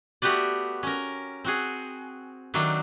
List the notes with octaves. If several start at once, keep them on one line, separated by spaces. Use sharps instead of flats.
A3 B3 F#4 G4 B4 D5
C#4 A#4
C4 F#4 G#4
D#3 F#3 A3 D4